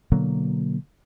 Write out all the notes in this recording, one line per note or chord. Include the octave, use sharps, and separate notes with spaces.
B2 D3 F#3 A#3